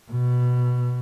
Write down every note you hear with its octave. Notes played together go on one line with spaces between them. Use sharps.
B2